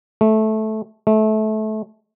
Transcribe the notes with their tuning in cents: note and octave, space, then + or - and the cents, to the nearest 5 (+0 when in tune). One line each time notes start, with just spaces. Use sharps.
A3 -15
A3 -25